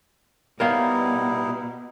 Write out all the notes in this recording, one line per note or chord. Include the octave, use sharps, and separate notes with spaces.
B2 G3 D#4 E4 A#4 C#5 F5